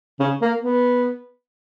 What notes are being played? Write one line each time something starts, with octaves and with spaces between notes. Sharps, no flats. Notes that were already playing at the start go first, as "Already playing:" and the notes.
C#3
A#3
B3